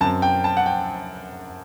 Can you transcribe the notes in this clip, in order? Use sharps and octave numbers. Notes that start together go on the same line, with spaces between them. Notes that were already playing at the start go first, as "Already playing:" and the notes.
F#2 F#3 C4 A5
G5
A5
F#5
G5